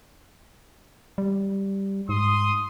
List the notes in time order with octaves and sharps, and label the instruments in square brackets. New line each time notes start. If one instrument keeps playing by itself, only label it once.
[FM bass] G3
[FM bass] G#2 [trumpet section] C6 D#6